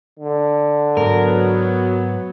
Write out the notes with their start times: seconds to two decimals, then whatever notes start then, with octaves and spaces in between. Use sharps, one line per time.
0.19 D3
0.97 G#2 F#3 B3 A#4